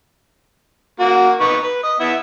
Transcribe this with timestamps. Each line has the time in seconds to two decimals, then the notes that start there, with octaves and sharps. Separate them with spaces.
1.00 A#3 F#4
1.40 D#4 B4 C#6
1.64 B4
1.83 D#5
2.00 B3 E4 E5